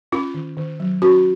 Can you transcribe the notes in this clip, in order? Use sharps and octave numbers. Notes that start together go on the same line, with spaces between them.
C#4 F4
D#3
D#3
F#3
C#4 F#4